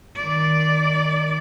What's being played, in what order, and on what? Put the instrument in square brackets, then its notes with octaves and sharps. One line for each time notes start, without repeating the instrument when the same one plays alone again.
[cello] D#3 D5